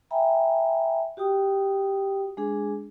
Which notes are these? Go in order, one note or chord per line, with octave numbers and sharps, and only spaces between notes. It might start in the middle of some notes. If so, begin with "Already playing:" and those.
E5 G5 G#5 A#5 B5
F#4 G4 G5 D#6
G#3 D4 G#4